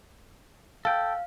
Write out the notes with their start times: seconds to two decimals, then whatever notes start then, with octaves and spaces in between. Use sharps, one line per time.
0.85 A4 F5 G5